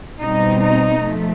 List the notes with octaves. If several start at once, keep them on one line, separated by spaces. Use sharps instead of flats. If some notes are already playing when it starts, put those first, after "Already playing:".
B2 G3 C4 D#4
D#4
F3 A3